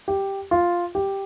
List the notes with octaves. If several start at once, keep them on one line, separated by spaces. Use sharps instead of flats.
G4
F4
G4